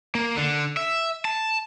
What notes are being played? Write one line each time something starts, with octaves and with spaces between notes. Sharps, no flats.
A#3
D3
E5
A5